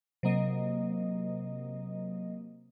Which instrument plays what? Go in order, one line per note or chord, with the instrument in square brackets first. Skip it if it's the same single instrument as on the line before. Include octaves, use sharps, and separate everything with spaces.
[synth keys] C3 F#3 A#3 D#5